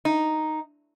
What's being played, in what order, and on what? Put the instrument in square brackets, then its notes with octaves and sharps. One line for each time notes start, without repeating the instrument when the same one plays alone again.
[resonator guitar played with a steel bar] D#4